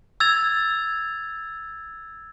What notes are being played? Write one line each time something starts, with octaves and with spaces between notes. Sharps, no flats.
E6 G#6 A6 F7